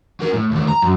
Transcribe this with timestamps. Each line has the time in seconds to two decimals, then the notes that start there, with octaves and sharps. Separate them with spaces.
0.20 F#3 A#4
0.33 A2
0.51 D#2 A3
0.68 A#5
0.82 F#2